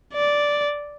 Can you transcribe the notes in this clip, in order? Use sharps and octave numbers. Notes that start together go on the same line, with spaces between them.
D5